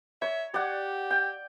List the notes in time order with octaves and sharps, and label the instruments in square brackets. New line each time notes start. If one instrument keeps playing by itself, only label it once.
[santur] C#5 [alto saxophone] E5
[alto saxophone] G4 [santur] D5 F#5
[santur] G5